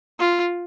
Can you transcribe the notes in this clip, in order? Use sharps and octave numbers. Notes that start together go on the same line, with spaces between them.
F4